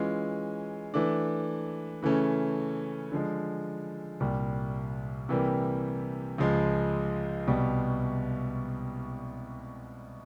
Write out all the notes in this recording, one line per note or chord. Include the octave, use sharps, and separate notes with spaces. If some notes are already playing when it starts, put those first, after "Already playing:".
Already playing: E3 G#3 C#4 F4
E3 A3 D4
C#3 E3 A3 C#4
D3 F3 G#3
C2 A#2 G3
C3 E3 G3 A#3
C#2 C#3 F3 G#3
C2 B2 G3